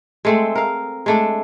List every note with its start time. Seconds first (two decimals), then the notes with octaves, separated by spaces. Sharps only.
0.25 G#3 A3 C4
0.55 A#4 F5
1.06 G#3 A3 D4